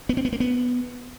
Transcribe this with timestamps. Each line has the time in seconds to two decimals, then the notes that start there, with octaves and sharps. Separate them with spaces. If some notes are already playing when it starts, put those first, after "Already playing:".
0.09 B3
0.17 C4
0.25 B3
0.33 A#3
0.40 B3